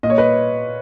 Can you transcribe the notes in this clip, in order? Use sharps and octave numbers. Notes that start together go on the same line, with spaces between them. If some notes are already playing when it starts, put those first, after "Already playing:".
A#2 D#5
C#5
B4 D#5